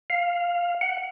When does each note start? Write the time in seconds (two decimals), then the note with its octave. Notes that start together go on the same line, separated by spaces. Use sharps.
0.10 F5
0.81 F#5